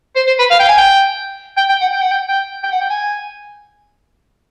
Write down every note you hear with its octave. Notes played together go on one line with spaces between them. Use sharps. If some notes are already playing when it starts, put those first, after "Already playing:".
C5
C5
B4
F5
G5
G#5
G5
G5
G5
F#5
G5
F#5
G5
G5
G5
F#5
G5
G#5